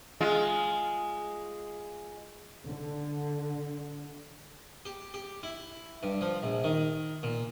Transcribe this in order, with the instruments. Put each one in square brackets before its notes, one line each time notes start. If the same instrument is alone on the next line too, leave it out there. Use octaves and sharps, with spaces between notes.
[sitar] G#3 F4
[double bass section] D3
[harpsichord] G4
G4
E4
G2
F3
A#1
D#3
A#2